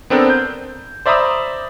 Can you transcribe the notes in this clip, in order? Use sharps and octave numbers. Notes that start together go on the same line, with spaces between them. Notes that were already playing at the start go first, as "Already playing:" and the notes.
B3 C4 D4 A4 A#4
G6
C5 D5 E5 A#5 B5 D#6